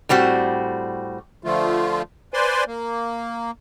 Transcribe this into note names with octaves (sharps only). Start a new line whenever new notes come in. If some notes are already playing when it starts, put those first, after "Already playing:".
A2 G3 C4 F#4
D3 F3 A3 F4
B4 C5 D5 G#5 C6
A#3